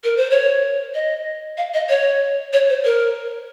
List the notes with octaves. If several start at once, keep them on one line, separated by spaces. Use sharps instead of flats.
A#4
C5
C#5
D#5
F5
D#5
C#5
C#5
C5
A#4